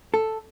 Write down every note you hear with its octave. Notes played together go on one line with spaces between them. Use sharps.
A4